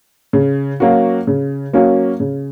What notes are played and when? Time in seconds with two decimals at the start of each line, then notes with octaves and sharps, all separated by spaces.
0.33 C#3
0.80 F#3 A#3 C#4 F#4
1.27 C#3
1.73 F#3 A#3 C#4 F#4
2.20 C#3